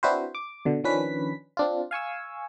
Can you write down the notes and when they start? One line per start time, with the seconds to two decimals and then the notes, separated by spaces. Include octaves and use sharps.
0.03 C4 D4 E4 F#4 B4 C5
0.35 D6
0.65 B2 D3
0.84 D#3 F3 C#4 D4 B4 B6
1.57 C4 D4 F4
1.91 F5 G#5 C#6 E6